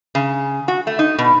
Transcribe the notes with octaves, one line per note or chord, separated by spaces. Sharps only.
C#3
F#4
A3
D#4
B2